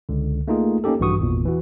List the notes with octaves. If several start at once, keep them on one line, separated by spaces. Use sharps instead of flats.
C#2 D3
A3 A#3 D#4 F4 G#4
A#3 C#4 D#4 G4 A4
A#1 G2 E3 F#4 C#6 D#6
G#1 E2 A#2
E3 F#4